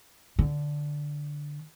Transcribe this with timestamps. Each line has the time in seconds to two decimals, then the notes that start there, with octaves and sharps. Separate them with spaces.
0.39 D3